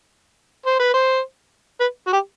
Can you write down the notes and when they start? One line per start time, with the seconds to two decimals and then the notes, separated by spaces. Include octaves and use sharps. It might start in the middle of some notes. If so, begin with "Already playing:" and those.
0.66 C5
0.79 B4
0.94 C5
1.80 B4
2.07 F#4
2.13 G4